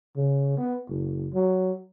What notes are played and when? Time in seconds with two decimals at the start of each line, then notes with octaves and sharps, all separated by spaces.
0.16 C#3
0.57 B3
0.88 F#1
1.33 F#3